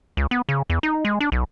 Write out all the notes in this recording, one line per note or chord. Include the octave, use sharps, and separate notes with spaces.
C#2
B3
C#3
E2
D#4
G#3
D4
B1